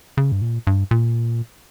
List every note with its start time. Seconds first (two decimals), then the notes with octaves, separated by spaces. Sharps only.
0.17 C#3
0.32 G2
0.42 A#2
0.67 G2
0.91 A#2